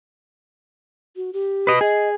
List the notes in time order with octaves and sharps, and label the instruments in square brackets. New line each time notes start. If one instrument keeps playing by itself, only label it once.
[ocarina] F#4
G4
[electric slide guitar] B4 D#5
[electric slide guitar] G#4 [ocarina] D#5